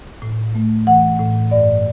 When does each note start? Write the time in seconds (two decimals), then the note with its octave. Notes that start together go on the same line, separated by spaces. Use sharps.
0.22 A2
0.55 A3
0.87 E3 F#5
1.20 A2
1.51 G2 D5